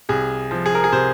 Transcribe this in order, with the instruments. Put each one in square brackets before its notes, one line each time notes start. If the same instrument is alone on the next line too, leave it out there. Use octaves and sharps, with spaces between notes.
[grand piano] C2 G#4
F3
G#4
A#4
G#4
C3 C5